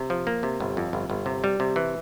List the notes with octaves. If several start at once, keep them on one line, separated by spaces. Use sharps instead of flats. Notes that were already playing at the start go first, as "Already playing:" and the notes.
Already playing: C3
F3
A#3
C3
G1
F2
G1
G1
C3
G3
C3
E3